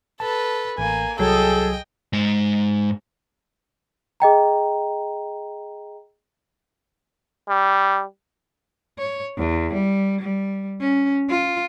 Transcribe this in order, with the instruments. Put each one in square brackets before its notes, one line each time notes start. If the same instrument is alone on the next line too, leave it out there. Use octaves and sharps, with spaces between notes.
[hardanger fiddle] A4 B4 [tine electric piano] A5
[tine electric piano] A1 [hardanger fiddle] A#3 [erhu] G#5
[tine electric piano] C2 F#3 [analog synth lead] G#4 [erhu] A4 [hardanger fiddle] D#5 G5
[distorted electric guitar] G#2 G#3
[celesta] G#4 D#5 G5 A#5
[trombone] G3
[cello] C#5
E2
G3
G3
C#4
F4